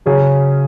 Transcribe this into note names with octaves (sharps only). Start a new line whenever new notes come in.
C#3 F#3 C#4 G#4